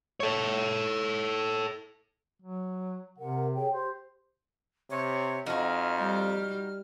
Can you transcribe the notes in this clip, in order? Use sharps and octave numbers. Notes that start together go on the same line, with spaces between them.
A4 C#5
F#3
C3 A#4 F#5
G#4 C#5 G5
G4 C5
C3 C#5
F2 D#4 F#4 F6
G3